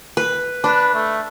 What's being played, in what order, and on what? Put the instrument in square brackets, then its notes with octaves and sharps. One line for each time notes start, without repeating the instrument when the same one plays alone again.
[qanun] B4
[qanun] D4 [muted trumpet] B4
[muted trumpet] A3